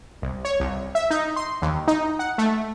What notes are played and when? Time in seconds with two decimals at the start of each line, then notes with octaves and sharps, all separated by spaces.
0.22 C2
0.45 C#5
0.60 C2
0.95 E5
1.11 D#4
1.36 C6
1.62 D#2
1.88 D#4
2.19 F#5
2.38 A3